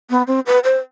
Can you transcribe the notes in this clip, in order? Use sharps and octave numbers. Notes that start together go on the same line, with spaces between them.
B3
C4
B4
C5